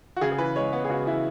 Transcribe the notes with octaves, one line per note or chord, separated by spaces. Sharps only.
F#4
C#3 G#4
G#4
E3 B4
G#3 C#5
B3
G#4
C#3 F#4
E3 E4